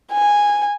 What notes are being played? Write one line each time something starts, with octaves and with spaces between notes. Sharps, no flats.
G#5